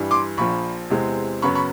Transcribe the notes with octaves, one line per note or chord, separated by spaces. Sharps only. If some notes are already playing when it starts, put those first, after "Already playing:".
Already playing: G2 E3 G3
C6 D6
A#1 A#2 F3 B5 C#6
E2 C3 E3 G#3 C4
F#2 C#3 F#3 B3 B5 C#6
B5 C#6